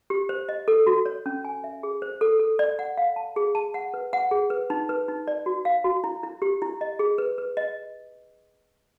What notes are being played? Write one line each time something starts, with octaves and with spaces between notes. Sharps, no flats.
G4
C5
D#5
A4
F#4
C#5
C#4
G#5
E5
G#4
C5
A4
A4
D5
F#5
F5
A5
G#4
A5
F#5
B4
F#5
G#4
B4
D#4
B4
D#4
D5
F#4
F5
F#4
E4
E4
G4
E4
D#5
G#4
B4
B4
D#5